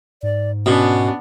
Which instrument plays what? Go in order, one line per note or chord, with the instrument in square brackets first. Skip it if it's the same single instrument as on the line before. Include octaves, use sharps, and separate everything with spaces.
[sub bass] G#2 [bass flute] D5
[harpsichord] B2 [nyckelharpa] B3 D4 [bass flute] C#4